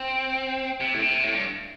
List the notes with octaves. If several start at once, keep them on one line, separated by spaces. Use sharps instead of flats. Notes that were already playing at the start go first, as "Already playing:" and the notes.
Already playing: C4
C3
A2
C3
A2
G2